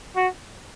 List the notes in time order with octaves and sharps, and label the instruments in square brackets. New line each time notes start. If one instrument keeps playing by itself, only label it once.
[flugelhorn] F#4